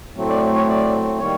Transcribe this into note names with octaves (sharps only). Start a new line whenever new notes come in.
A2 F#3 A3 C4
D5
C#5
D5
D#3 G3 A#3 C#5